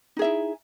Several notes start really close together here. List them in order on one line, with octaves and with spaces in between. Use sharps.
D#4 G#4 E5 E4